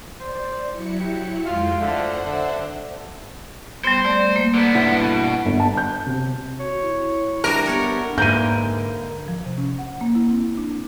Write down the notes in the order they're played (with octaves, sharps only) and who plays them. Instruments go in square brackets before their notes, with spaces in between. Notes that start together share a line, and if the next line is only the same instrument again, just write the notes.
[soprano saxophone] C5 [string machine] D5
[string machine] F#3 E4 C#7
[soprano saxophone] G4
[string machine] F2 G#3 G5 [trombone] F4 [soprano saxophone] F5
[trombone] D3 [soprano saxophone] A3 [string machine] C5 F#5
[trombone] D3 [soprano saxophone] E5
[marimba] G3 B3 [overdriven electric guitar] C5
[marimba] A3 D5
A#3
[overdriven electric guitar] D3 B3
[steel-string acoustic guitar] G2 E4 F#5
[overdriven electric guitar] B2
[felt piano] G1
A5
G6
C3
[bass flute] F#4 [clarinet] C#5
[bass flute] E4
[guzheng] G3 D4 E4 [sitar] A#4
[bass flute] B3 [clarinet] G4 [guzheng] A4 C#5 F#5
[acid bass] G#2 [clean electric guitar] D3 A#3 B4 [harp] A#4 E5 [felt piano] G6 D#7
[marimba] F3
C3
C#4
F#5
A#3
E4
C4
D4